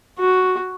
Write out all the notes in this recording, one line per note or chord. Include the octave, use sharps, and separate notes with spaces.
F#4